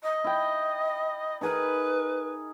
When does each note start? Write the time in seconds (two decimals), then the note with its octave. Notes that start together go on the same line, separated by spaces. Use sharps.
0.03 D#5
0.24 E4 G5
1.41 D#4 G#4 A#4 B4